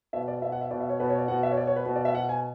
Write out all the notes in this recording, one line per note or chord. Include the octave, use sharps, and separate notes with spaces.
B2 E5
D5
B2 E5
F#5
E5
B2 D5
E5
C#5
B2 B4
C#5
D5
B2 F#5
E5
C#5
B2 D5
C#5
B4
B2
D5
E5
B2 F#5
G#5